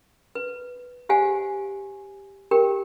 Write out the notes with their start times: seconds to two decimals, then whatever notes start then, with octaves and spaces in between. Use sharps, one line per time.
0.35 B4
1.09 G4 C5 F5 F#5 G#5
2.51 G4 A#4 G5